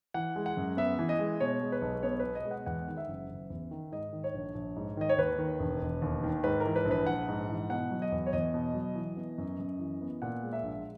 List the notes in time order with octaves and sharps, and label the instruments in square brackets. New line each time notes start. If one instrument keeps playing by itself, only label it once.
[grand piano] E3 F#5
G#3
F#5
F#2
B3 E5
E3
D#5
G#3
B2 C#5
G#3
B4
B1
B3 C#5
B2 B4
D#5
G#3
F#5
E2 F#5
D#3
E5
F#1
F#1
E2
D#3
G#2 D#5
D#3
C#5
A#1
A#1
G#2
D#3 D#5
C#5
D#2 B4
D#3
E1
E1
D#2
D#3
G#2 B4
A#4
E3
B4
A#1
B4
A#1 F#5
G#2
E3
B2 F#5
F#3
D#5
E2
C#5
E2 D#5
B2
F#3
E3
B3
F#2
F#2
E3
B3
A#2 F#5
G#3
E5
A#1